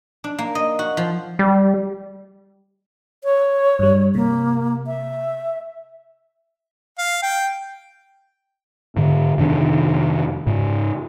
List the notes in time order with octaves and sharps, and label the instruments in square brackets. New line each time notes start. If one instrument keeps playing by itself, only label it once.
[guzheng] D4
A#3
D#5
F#4
F3
[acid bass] G3
[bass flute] C#5
[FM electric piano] G2 G3
[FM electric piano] C3 [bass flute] A#3
[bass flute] E5
[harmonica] F5
G5
[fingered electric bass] G#2 D3
F2 C3 D#3 D4
G#2 C#3